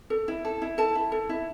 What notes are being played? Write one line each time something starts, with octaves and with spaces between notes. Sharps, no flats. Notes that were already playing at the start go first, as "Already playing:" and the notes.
A4
E4
A4
E4
A4 A5
E4
A4
E4